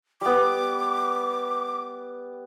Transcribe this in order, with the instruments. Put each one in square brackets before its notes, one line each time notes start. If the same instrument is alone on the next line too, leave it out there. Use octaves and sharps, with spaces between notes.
[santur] G3 B3 [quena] D6